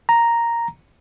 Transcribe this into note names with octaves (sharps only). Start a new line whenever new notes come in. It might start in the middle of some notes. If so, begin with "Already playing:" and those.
A#5